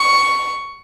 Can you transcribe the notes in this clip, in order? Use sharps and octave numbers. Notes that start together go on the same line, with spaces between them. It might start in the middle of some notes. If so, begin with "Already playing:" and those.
Already playing: C#6